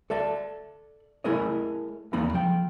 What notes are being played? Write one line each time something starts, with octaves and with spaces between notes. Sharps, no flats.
A4 D5 E5 A5
A3 E4 G#4 A#4 C#5 D#5
E2 A#3 D#4 A#5 B5
F3 G5